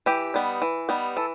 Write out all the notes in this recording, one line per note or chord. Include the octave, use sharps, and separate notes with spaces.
E3 G4
G3 B3 D#4
E3
G3 B3 D#4
E3 A4